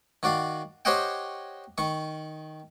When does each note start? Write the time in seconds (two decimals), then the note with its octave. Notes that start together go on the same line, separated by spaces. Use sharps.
0.23 D#3 F#4 D5 F5
0.85 G4 C5 C#5 D#5 F#5 G5
1.78 D#3 C#6